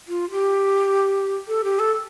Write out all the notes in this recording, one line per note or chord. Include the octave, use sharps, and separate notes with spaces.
F4
G4
A4
G4
A4